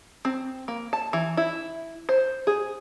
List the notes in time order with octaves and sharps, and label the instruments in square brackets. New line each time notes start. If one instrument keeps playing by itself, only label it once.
[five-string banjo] C4
A#3
A5
E3
E4
C5
G#4